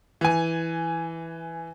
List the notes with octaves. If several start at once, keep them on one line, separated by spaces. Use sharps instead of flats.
E3 G#5